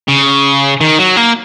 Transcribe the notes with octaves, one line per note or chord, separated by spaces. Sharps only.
C#3
D#3
F#3
A#3